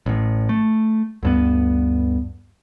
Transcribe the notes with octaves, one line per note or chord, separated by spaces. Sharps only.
A1 A2
A3
D2 G2 B3